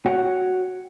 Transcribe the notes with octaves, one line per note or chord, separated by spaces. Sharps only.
F#4 C#5 F#5 G5